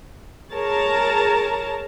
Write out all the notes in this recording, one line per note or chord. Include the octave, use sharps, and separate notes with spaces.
G#4 A#4 C#5 A5 A#5